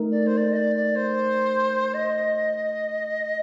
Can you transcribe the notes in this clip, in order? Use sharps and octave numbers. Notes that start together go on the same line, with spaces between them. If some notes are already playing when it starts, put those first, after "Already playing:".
Already playing: A3 D#4 A#4
D5
C5
D5
D#5
D5
D5
C5
D#5